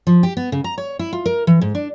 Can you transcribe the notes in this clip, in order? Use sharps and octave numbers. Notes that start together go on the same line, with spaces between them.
F3
G4
B3
C#3
A#5
C#5
E4
F4
A#4
E3
G#2
D4